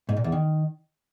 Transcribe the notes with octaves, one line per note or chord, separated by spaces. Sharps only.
G#2
A#2
E2
D#3